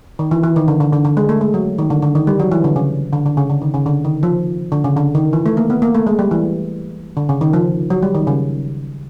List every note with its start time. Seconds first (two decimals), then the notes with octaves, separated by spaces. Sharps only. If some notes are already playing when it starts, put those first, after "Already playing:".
0.19 D#3
0.31 E3
0.43 E3
0.56 D#3
0.68 D3
0.81 D3
0.93 D3
1.05 D3
1.17 G#3
1.29 A3
1.41 G#3
1.54 F#3
1.78 D#3
1.90 D3
2.02 D3
2.15 D#3
2.27 G3
2.40 F#3
2.52 E3
2.64 D3
2.76 C#3
3.13 D3
3.26 D3
3.37 C#3
3.50 D3
3.62 D#3
3.74 C#3
3.86 D3
4.05 D#3
4.23 F3
4.72 D3
4.84 C#3
4.97 D3
5.15 D#3
5.33 E3
5.46 A3
5.57 A#3
5.70 B3
5.82 A#3
5.95 A3
6.07 G#3
6.19 G3
6.31 E3
7.17 D3
7.29 C#3
7.41 D#3
7.53 F3
7.90 F#3
8.02 G3
8.15 D#3
8.27 C#3